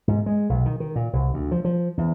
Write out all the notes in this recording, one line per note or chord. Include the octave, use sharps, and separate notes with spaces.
G#2
G#3
B1
D#3
D#3
A#2
C2
D2
F3
F3
E2